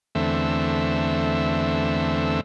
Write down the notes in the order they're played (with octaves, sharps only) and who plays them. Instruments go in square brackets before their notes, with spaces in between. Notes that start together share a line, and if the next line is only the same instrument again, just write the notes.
[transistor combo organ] E2 D3 A3 C4 E5